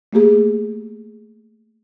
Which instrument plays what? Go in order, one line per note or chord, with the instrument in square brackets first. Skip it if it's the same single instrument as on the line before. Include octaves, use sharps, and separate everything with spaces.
[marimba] A3 A#3 G4 G#4